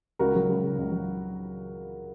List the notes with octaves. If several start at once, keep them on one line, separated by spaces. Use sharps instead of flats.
C#2 F#4 A#4
F#3
C#2
C#3
C#2
F#3